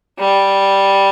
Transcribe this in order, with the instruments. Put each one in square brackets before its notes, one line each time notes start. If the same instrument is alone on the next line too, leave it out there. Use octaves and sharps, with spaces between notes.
[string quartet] G3